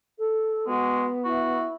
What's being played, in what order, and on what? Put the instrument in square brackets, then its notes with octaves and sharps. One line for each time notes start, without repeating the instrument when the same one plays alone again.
[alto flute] A4
[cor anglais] G#3 [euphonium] B3 [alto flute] F#4
[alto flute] E4 [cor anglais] F#4